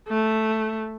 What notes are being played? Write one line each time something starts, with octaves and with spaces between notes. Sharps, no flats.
A3